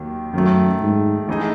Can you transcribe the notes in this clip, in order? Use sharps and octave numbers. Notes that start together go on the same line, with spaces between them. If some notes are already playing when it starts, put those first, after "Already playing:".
Already playing: D#2 D#3 F#3
F#2 D#3 F#3 A3
G#2
E3 A3 D#4 G#4 D#5